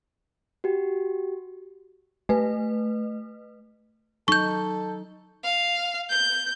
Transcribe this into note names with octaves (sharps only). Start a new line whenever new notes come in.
F#4 G4
A3 B4
F#3 D#4 A4 C#6 G6
F5
G6